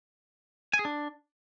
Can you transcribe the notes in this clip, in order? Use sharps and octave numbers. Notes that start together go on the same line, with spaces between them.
G#5
G#4
D4